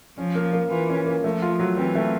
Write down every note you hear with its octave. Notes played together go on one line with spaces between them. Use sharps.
F3 C#4
A#3
A#3
E3 F4
C#4
A#3
F3 A3
F4
F#3
E3 C4
A3